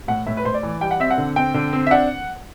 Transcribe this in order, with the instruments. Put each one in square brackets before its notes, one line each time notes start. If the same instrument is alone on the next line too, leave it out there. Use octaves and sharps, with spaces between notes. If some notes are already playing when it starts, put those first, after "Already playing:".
[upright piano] A2 F#5
A2 E5
B4
A2 C5
D5
E3
G3 G5
F#5
C4 E5
F#5
D3
C4 G5
D3
C4
E5
D4 F#5